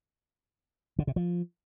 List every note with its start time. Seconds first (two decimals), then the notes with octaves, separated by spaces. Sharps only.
0.99 D3
1.07 C3
1.16 F3